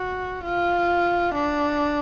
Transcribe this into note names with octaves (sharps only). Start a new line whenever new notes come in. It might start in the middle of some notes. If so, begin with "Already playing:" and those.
Already playing: F#4
F4
D4